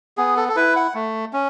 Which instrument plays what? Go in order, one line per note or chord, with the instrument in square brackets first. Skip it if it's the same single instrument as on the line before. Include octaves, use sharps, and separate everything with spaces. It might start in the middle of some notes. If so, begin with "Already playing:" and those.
[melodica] B3 G#4
A4
A4
E4 B4
F#5
A3
C#4